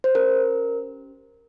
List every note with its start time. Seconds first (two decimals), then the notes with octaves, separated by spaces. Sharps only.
0.04 C5
0.15 C#4 G4 A#4